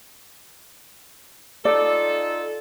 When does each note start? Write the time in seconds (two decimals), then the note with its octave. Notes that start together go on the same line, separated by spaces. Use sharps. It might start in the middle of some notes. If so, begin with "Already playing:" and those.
1.65 D#4 F4 A4 D5